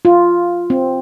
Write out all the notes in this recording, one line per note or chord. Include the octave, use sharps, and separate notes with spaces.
F4
C4